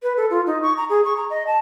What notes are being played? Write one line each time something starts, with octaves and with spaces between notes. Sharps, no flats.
B4
A4
F4
D#4
C#6
A#5
G#4
C#6
A#5
D#5
A5